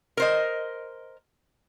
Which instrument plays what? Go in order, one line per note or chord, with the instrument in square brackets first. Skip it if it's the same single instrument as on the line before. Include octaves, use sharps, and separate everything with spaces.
[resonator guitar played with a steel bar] A#4 C5 D#5